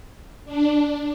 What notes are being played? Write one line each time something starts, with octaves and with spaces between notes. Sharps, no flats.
D4